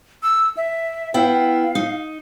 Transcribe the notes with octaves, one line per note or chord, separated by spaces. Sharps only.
E6
E5
B3 E4 F5 G5
D#4